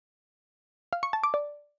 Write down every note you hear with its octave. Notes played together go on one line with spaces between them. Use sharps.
F5
C#6
A5
D6
D5